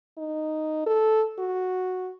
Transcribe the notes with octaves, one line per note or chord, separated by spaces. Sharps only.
D#4
A4
F#4